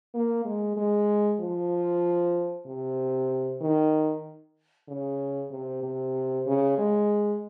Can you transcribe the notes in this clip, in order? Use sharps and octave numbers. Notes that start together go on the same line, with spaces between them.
A#3
G#3
G#3
F3
C3
D#3
C#3
C3
C3
C#3
G#3